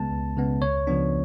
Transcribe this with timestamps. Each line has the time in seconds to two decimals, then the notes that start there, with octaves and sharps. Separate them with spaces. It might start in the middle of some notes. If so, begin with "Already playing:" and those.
Already playing: C#2 C#3 G#3 B3 A5
0.11 C#2
0.37 C#3 G#3 B3
0.62 C#2 C#5
0.87 C#3 F3 B3 D4